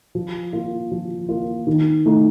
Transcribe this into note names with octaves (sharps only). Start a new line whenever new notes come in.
F3
A#3 F4
F3
A#3 F4
D#3
A3 D#4